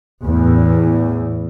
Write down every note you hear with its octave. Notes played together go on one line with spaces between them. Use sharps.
E2 A2